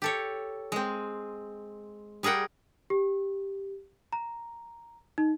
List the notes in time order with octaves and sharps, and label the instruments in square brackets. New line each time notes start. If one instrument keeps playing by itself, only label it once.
[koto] G4 A4 C#5
G#3 C4
G3 G#4 A#4 F#5 G5
[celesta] G4
A#5
D#4